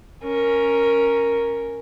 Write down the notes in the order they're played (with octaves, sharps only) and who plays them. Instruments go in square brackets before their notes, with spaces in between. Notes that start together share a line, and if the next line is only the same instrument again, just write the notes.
[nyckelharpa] C#4 A#4